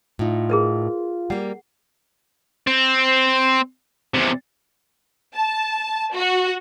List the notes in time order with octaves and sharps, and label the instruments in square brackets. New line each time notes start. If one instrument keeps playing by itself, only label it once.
[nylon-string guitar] A2 D#4 [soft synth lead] F4
[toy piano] G#4 A#4 B4
[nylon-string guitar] G3 A#3 [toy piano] F#5
[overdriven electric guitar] C4
E2 C3
[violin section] A5
F#4